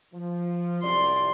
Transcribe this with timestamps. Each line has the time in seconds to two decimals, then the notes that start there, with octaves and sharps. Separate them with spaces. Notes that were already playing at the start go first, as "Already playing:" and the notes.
0.14 F3
0.82 C2 F#2 D5 C6